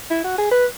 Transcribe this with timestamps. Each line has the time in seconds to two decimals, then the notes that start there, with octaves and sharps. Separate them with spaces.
0.10 E4
0.24 F#4
0.38 G#4
0.51 B4